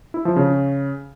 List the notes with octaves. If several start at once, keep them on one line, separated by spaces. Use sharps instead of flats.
E4
F3
C#3